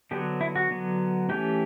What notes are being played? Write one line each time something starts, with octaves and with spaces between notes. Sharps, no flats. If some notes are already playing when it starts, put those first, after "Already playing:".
D3 F#3 B3 G4
E4
F#4
D3 F#3 B3
E3 A3 C#4 G4